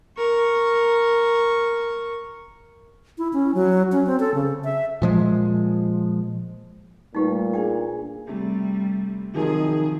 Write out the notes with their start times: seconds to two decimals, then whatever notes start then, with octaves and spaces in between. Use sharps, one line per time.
0.18 A#4 C#6
3.18 E4
3.33 C#4
3.55 F#3
3.92 C#4
4.06 C4
4.20 A4
4.34 C#3
4.64 E5
5.02 A#2 F3 G#3
7.15 A#2 G3 A3 D#4 G4 B4
7.54 D4 G#4 G5 G#5
8.27 C3 G3 A3
9.34 C3 D#3 F3 F#3 G#4